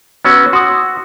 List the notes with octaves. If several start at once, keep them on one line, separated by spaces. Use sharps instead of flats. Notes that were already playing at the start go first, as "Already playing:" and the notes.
B3 C#4 F#4 E6
F#4 C6 D#6